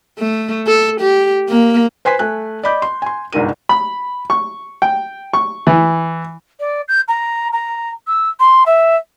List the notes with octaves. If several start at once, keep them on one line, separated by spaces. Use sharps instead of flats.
A3
A4
G4
A#3
B4 C5 G#5 C6 B6
A3 G#5 F#6
D5 D#5 B5 D6 G6
C6
G#5 C6
G1 C2 G#2 A#4 D#7
B5
C#6
G5
C#6
E3
D5
G6
A#5
A#5
E6
C6
E5